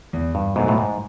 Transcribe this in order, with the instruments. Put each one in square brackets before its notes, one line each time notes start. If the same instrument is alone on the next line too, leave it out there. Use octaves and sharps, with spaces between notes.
[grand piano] E2
[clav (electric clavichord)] G2
[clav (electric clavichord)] G#2 [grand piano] B2 F#3 A3
[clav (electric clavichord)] A2
G#2